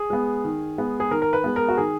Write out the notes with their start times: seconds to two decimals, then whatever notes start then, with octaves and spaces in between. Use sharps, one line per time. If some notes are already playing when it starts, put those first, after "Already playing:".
Already playing: G#4
0.10 G#3 B3
0.44 D#3
0.78 G#3 B3
1.00 G#4
1.11 D#3 A#4
1.22 A#4
1.33 B4
1.44 G#3 B3
1.56 A#4
1.68 F#4
1.77 D#3 G#4